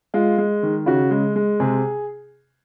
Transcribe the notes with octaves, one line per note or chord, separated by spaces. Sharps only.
G#3 F4
G#3
D#3
C#3 F#4
G#3
G#3
C3 G#4